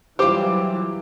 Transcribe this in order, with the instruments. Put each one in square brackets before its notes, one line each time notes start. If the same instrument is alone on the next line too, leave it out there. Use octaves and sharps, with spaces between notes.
[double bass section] E3 F#3 G3 [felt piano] F4 D6 [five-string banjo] G4 C5